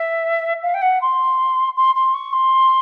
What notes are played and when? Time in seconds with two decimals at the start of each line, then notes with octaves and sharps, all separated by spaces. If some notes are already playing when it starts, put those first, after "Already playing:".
Already playing: E5
0.63 F5
0.74 G5
0.82 F#5
1.02 C6
1.76 C6
1.95 C6
2.14 C#6
2.33 C6